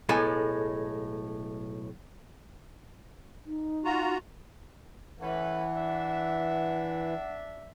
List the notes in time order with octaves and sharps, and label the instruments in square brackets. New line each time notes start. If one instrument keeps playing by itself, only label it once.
[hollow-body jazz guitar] B1 A2 G#3 A4 G#5
[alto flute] D#4
[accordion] F4 F#4 A#5
[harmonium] E3 [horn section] A3 C#4 B4 [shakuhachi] F#5
[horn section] D4 E5